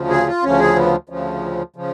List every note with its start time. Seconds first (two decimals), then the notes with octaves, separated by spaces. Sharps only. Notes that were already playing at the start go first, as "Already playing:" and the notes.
Already playing: D2 C#3 F3
0.10 G#4
0.27 F4
0.43 D2 C#3 F3 C#4
0.60 G#4
0.76 B3
1.09 D2 C#3 F3
1.76 C#3 F3